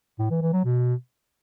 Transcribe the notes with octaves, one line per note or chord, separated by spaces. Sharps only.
A2
E3
E3
F#3
B2